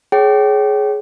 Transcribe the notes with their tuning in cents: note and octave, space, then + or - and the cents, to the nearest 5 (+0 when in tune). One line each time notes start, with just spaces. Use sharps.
G#4 +15 C#5 +0 G5 -30